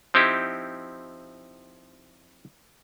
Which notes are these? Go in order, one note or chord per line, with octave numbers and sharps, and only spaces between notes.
F3 C4 D#4 E4 G4